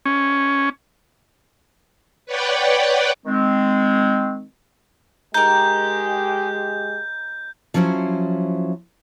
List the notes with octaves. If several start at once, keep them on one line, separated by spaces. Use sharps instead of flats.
C#4
B4 C#5 D5 F#5 G5
D#3 G#3 C4
G#3 D#4 G4 A#4 G6
F3 F#3 C#4 E4 C5